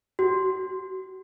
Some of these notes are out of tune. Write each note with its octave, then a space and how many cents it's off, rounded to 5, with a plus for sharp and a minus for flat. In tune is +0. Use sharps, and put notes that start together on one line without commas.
F#4 +40